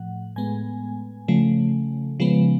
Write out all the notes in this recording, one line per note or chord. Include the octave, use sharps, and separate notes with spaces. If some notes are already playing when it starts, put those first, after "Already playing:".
Already playing: A2 F3 F#5
A2 G#3 B3 G#5
C#3 F3 A3
C#3 F3 G#3 B3